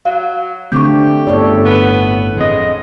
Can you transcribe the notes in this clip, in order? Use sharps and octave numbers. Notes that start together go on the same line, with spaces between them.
F#3 F5
D3 A3 C4 G4 C#6 D6 G6
G1 A2 A3 A4 C#5 D5
B3
F2 G#3 D#5